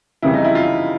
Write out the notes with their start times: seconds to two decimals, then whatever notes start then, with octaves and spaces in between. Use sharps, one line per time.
0.22 F2 C#3 E3 G3 E4
0.34 D#4
0.44 E4
0.55 F4